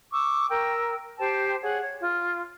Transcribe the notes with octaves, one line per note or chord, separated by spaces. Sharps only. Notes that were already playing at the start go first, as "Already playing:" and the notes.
C#6 D6 E6
A#4 G5 E6
G4 C5 G5 A5
G#4 C#5 F#5
C#5
F4